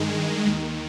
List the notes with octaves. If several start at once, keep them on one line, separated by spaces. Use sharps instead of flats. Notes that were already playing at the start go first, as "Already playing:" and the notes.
Already playing: G2 D#3 G#3
D#2 D#3